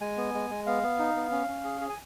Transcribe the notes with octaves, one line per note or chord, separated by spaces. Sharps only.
G#3 G#5
B3
G#3
G#3
B3 F5
B3
D#4
B3
C#4
C#4
G#4
G#4
G#5